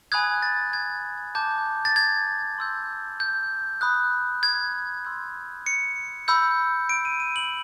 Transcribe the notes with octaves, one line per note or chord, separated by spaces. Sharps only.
G#5 B5 D#6 F#6 G#6
A6
G#6
A5 D6 G6
A6
G#6
C6 E6 G6
G6
B5 D#6 F#6
G#6
C6 E6 G6
C#7
B5 E6 G6
D7
D#7
D#7
F#7